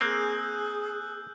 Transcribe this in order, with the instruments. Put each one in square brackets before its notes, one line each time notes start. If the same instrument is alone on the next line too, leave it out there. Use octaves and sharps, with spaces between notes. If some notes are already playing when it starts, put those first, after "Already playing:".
[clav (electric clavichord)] A#3 C4 [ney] G#4 [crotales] E6 F#6 G6